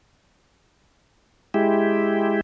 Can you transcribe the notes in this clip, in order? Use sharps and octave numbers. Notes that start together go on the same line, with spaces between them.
G#3 E4 G4